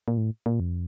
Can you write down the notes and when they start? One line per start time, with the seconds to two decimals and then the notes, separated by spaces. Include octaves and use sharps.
0.08 A#2
0.18 A2
0.46 A#2
0.60 F2